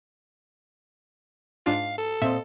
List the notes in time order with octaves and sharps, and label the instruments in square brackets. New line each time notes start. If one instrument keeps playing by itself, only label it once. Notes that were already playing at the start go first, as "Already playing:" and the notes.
[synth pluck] G#2 D4 F4 [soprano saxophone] F5
[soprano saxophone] A4
[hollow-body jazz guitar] A#2 C4 D#5 [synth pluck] E5 E7